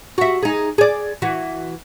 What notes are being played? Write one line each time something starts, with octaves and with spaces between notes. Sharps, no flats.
F#4 E5
D#4 G#4
G#4 D5
E3 F#4